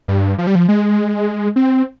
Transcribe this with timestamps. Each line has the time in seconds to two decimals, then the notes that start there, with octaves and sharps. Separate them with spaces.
0.08 G2
0.38 F3
0.47 G3
0.55 F3
0.68 G#3
1.56 C4